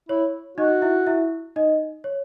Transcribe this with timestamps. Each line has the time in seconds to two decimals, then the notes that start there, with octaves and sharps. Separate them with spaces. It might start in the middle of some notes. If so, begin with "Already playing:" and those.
0.09 E4 C#5
0.58 D#4 F#4 D#5
0.82 E4 E5
1.07 E4 E5
1.56 D#4 D#5
2.04 C#5